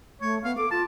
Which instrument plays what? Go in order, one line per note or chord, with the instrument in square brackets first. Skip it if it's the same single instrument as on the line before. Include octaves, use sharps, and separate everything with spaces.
[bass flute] A3 [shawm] C#5
[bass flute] B3 [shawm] F5
[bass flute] A4 [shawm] D6
[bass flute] F4 [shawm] A5